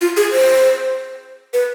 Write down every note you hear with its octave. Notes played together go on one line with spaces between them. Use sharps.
F4
G#4
C5
B4